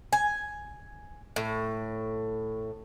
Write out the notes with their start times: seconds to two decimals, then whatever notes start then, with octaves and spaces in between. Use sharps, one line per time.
0.13 G#5
1.36 A2